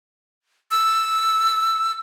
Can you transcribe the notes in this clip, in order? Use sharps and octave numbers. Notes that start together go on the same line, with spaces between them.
E6